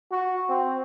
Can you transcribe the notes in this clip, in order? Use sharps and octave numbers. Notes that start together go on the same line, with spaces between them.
F#4
C4